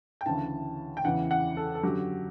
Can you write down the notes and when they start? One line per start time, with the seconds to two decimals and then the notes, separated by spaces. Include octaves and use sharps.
0.21 G5
0.26 D2 C#3 E3 A5
0.97 G5
1.05 E2 C#3 E3 F#5
1.31 F#5
1.57 A4
1.75 A4
1.83 F#2 D3 F#3 G4